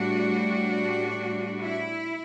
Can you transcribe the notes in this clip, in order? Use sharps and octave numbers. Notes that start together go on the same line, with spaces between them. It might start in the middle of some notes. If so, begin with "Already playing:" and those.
Already playing: A2 G3 D4 F#4
E4